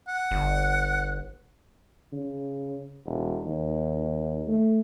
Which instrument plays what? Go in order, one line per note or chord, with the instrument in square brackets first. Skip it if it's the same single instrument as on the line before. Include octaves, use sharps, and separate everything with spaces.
[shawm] F#5
[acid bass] G1
[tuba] C#3
E1
D#2
A3